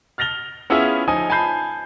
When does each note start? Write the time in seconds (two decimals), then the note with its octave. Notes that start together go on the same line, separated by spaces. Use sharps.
0.18 F6 A6 A#6 F7 G7
0.70 B3 C#4 E4 F4 G#4 E5
1.08 F3 D#4 G#5 D#6
1.30 G#5 A5 B5 G6 C7